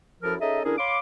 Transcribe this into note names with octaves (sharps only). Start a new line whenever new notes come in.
F#2 F3 E4 A4 A#4 F6
C#4 D#4 G#4 A4 D#5 E5
D3 C#4 D4 E4 G#4 A#4
C#5 F5 B5 C6 D6